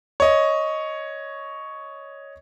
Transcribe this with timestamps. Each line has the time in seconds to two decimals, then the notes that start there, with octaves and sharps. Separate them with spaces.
0.20 C#5 D#5